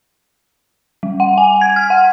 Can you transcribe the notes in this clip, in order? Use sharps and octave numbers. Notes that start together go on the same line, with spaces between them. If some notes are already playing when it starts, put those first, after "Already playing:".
G3
F#5
G#5
G#6
F6
F#5